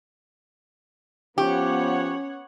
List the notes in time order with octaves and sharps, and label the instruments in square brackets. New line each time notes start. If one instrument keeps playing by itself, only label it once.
[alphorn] F3 [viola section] B3 C#5 F#5 [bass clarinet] C#4 [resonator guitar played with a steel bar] G4